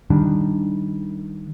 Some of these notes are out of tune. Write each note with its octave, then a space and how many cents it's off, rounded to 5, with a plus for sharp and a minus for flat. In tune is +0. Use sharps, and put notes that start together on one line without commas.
D#3 +0 G3 +0 D4 +0